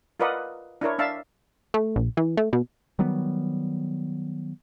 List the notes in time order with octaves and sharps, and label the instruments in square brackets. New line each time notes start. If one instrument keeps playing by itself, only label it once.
[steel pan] F4 A#4 B4 D5 D#5 F#5
D4 E4 A#4 C#5
D4 E5 F5 A5
[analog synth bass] A3
A#1
E3
A3
B2
[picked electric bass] D#3 F#3 G3 B3